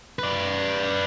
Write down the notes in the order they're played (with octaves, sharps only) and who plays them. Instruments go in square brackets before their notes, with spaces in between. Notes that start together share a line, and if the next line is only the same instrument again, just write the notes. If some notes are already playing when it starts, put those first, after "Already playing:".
[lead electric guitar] B4 D5